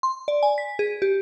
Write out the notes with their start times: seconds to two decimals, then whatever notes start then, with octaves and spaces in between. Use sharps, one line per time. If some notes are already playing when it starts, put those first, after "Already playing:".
0.03 C6
0.28 D5
0.43 G#5
0.58 B6
0.79 G#4
1.02 G4